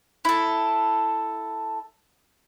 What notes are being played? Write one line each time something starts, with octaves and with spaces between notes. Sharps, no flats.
E4 A4